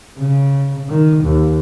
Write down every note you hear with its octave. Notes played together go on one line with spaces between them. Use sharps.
C#3
D#3
D#2